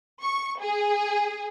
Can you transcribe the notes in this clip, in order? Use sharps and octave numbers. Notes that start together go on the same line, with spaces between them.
C#6
G#4